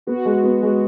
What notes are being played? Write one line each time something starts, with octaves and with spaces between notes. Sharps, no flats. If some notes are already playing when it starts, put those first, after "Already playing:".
B3 F#4
G#3
B3
G#3